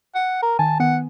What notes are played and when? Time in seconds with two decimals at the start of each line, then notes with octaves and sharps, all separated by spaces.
0.15 F#5
0.42 A#4
0.59 D#3 G#5 A5
0.80 D#3 B3 F#5